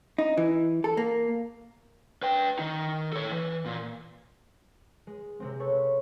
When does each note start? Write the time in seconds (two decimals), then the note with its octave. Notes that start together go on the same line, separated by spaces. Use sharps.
0.18 D#4
0.37 E3
0.84 A4
0.97 A#3
2.23 B4 G5
2.59 D#3 D#4
3.13 A4 C#5
3.32 E3
3.65 A#2
5.07 G#3
5.40 C3 G#3 C4
5.59 A4 B4 C#5 A5